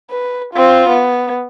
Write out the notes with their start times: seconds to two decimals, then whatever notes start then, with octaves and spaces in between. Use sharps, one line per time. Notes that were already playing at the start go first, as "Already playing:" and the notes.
0.10 B4
0.54 C4 F4
0.90 B3